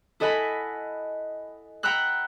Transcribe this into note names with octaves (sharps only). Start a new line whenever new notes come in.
E4 A4 D#5 F#5 G#5 B5
F#5 G5 A#5 B5 E6 F#6